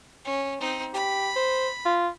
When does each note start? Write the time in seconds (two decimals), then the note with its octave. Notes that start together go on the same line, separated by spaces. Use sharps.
0.25 C#4
0.60 C4 D#4
0.94 G4 B5
1.36 C5
1.85 F4